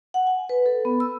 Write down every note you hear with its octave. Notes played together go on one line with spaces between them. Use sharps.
F#5
G#5
B4
A4
B3
E6